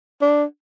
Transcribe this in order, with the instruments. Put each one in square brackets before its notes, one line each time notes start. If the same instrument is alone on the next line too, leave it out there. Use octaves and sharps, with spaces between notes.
[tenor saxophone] D4